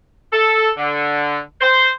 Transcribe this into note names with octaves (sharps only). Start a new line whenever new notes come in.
A4
D3
C5